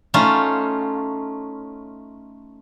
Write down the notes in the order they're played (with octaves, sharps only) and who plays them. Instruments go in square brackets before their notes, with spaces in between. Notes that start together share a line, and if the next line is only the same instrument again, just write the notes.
[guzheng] A3 C#4 D#4 F4